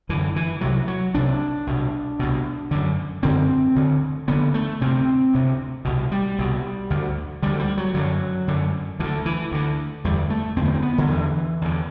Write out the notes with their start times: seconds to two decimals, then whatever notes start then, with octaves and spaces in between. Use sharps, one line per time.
0.09 F#2 D3 E3
0.36 E3
0.61 C2 C3 F#3
0.88 F#3
1.15 C2 C3 D4
1.67 C2 B2
2.19 C2 B2
2.71 F#2 D3
3.23 F#2 D3 C4
3.76 D2 D3
4.28 D2 D3 B3
4.54 A3
4.81 D2 C3 C4
5.34 D2 C3
5.85 C2 B2
6.12 G3
6.38 C2 B2
6.90 D2 D3
7.42 D2 D3 G3
7.59 G3
7.78 F#3
7.94 F#2 D3 F#3
8.48 F#2 D3
9.00 D2 E3
9.04 D3
9.26 E3
9.51 D2 D3
10.04 E2 D3 G3
10.30 A3
10.56 E2 C4
10.61 D3 B3
10.74 C4
10.82 B3
10.98 D3
11.08 E2 D3 E3
11.61 E2 D3